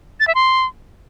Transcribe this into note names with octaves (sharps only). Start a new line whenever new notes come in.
A6
E5
C6